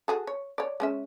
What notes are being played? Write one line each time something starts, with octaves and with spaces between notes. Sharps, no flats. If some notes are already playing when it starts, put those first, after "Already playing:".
F#4 G#4 A4
C#5
C#5 D5
G#3 C#4 E5